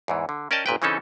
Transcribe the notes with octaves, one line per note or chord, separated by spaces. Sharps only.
E2 G#2 E3
D3
C#4 A#4 D5 D#5 G5 A5
G1 A#2 B4 G5
C#3 E3 C4 C#4 D#4 A4